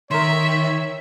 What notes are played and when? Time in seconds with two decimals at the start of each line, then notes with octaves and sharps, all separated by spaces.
0.11 D#3 A#4 C#5 E5 C6